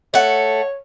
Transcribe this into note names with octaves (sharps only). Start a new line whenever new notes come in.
A3 C#5 F#5